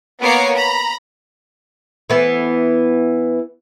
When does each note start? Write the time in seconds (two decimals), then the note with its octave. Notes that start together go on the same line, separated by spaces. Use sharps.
0.21 A#3 B3 C#5 A#5 D6 C7
0.52 A#5 B5
2.10 E3 B3